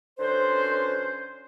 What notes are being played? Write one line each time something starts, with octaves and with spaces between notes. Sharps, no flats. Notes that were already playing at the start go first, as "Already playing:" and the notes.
D3 F#3 C#4 B4 C5